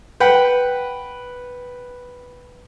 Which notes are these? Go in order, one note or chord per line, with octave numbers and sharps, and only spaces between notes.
B4 F#5 G5 B5